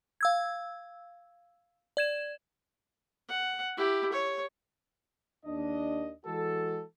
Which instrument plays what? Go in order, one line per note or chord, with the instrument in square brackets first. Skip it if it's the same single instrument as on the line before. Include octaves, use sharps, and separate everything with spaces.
[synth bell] F5 E6 G#6
D5 G#6 E7
[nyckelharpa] F#5
E4 G4
C#5
[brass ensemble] D#2 D4 D#5
E3 G#3 F#4 A4